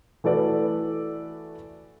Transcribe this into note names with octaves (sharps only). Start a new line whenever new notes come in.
E3 A3 F#4 A4 B4 D5